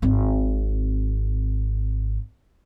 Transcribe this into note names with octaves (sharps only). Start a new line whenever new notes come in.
G#1 C4